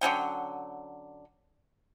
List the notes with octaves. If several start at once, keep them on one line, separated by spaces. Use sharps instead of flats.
D3 F#3 C#4 G5